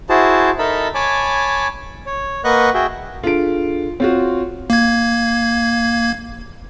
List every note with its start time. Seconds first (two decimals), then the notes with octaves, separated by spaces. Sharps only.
0.09 E4 F#4 G#4 C5 A5
0.59 D#4 A4 A#4 E5 A5 B5
0.95 C#5 G#5 A5 B5 D6
2.06 C#5
2.44 A#3 B4 D#5 F#5 C#6 F#6
2.74 F#4 G#4 E5 G5
3.24 D4 F4 G#4 A4 D7
4.00 C4 F4 F#4 C#5
4.70 A#3 G#6